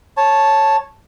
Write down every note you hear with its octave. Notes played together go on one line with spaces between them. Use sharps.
C#5 A5